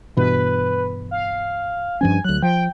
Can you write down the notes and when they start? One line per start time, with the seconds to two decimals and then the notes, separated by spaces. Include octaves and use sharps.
0.17 G2 B2 E3 B4
1.11 F5
2.01 G2 F3 C#4 G#5
2.24 D2 F#3 F#6
2.42 F3 G5